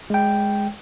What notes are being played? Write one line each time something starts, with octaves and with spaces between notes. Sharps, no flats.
G#3 G5